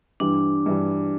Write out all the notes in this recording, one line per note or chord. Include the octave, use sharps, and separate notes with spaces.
G2 E3 G3 D4
G2 E3 G3